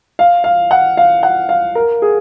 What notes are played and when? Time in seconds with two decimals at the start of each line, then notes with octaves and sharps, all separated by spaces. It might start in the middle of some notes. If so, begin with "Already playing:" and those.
0.19 F5
0.44 F5
0.71 F#5
0.97 F5
1.23 F#5
1.49 F5
1.75 A#4
2.02 G#4